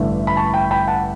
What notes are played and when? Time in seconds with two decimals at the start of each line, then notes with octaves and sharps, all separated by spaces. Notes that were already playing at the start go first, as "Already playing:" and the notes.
Already playing: A1 G2 D3 A3
0.27 B5
0.37 A5 C#6
0.54 G5 B5
0.71 G5 B5
0.87 F#5 A5